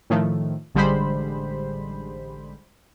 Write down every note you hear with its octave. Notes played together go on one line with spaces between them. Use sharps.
A2 D#3 F3 A3
A1 D3 G3 G#3 C5 B5